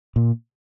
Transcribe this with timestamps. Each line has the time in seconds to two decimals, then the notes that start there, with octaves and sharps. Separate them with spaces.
0.16 A#2